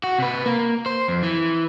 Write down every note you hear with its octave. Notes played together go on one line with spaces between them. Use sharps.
F#4
C3 B4
A#3
C5
F2
E3